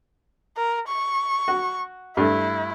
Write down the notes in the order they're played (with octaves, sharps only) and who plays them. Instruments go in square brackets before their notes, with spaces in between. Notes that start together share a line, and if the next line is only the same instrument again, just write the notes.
[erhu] A#4
C#6
[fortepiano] F#4
[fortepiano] G2 A3 [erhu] E4